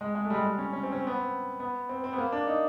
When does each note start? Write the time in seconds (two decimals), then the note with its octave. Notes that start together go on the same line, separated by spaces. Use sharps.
0.01 G#3
0.15 G#3
0.25 A3
0.30 G3
0.34 G#3
0.44 G3
0.58 C#4
0.73 C#4
0.83 C4
0.92 C#4
1.00 C4
1.07 B3
1.14 C4
1.60 B3
1.89 C4
2.04 C4
2.13 B3
2.18 A#3
2.32 D4
2.47 D#4